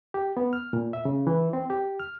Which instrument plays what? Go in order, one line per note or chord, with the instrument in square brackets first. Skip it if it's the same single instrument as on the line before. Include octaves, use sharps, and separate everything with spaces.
[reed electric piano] G4
B3
F6
A#2
E5
C#3
E3
C4
G4
F6